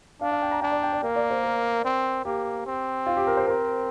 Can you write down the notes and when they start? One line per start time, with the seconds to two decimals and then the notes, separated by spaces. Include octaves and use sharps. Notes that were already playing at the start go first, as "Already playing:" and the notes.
0.21 D4 F5
0.31 F5
0.42 G5
0.51 A#5
0.61 D4 G5
0.72 D5
0.83 G5
0.93 D5
1.03 A#3 A#4
1.16 D5
1.30 C5
1.43 A#4
1.85 C4
2.25 A#3 G4
2.66 C4
3.06 F4
3.17 G4
3.27 A#4
3.37 C5
3.47 C4 A#4